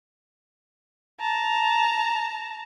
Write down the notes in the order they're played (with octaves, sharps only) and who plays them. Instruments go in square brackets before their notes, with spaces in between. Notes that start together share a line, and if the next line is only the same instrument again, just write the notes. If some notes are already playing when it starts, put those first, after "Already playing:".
[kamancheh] A5 A#5